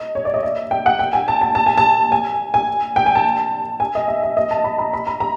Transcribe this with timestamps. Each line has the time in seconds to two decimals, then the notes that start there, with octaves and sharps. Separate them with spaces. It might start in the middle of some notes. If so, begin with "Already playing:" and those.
Already playing: D#5
0.15 C#5
0.25 D5
0.34 D#5
0.43 E5
0.71 G5
0.86 F#5
0.99 G5
1.13 G#5
1.28 A5
1.41 A5
1.55 A5
1.66 G#5
1.78 A5
2.12 G#5
2.54 G#5
2.96 G5
3.06 G#5
3.15 A5
3.80 G#5
3.95 D#5
4.08 E5
4.23 E5
4.37 D#5
4.51 A5
4.64 B5
4.79 A#5
4.93 B5
5.07 A#5
5.20 A#5